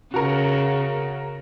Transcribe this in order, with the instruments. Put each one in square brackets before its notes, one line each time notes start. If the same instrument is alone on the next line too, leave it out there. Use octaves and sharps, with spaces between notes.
[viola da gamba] C#3 [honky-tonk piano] F#4 A#4